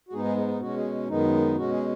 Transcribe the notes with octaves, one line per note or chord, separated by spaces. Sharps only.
F#4
G#2 G#3 B3 D#4 G#4
G#4
D#4
D#4
B2 G#3 C#4 F#4
G#4
F#2 D#3 G#3 B3 D#4
B2 G#3 C#4 F#4
G#4